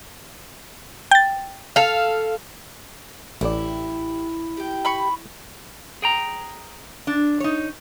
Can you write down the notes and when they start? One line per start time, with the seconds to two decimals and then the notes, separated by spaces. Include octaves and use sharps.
1.11 G5 A6
1.76 A4 F5
3.41 A1 E4 G4 D5
4.57 G4 G5
4.85 B5 C#6
6.02 G#4 G5 A#5
7.07 D4
7.40 D#4 C#5